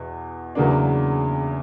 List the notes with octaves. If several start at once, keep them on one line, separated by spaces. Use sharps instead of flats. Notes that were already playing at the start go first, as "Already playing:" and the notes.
Already playing: E2 B2
E2 C#3 F#3 A#3 D4